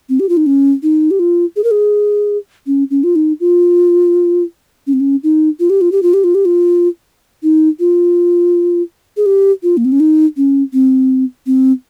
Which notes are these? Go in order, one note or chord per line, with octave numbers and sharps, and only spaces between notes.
C4
G4
F4
D#4
C#4
D#4
G4
F4
G#4
A#4
G#4
C#4
C#4
F4
D#4
F4
C#4
C4
C#4
D#4
F4
G4
F4
G4
F4
G4
F4
G4
F4
D#4
F4
G#4
G4
F4
A#3
C4
C#4
D#4
C#4
C4
C4